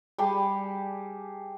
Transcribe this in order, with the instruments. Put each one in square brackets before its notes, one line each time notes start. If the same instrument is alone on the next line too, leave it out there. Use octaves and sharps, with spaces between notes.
[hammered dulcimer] G3 G4 G#4 A5